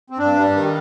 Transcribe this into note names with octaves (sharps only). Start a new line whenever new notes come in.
C4
G2 D4
G3
D#3